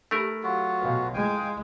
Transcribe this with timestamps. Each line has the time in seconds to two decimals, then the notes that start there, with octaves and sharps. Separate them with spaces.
0.11 A3 D#4 G4 A#4 B5
0.43 F#3 F4 F#4
0.81 B2 B4 F5 G5
1.14 G#3 E4 F4 F5 G5 G#5 A#5